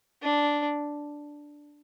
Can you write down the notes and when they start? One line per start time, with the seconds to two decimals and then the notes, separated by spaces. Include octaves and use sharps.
0.23 D4